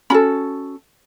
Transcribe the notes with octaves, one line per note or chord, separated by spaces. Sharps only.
C#4 F#4 A4 B5